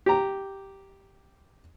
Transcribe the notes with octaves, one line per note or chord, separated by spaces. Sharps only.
G4 A#5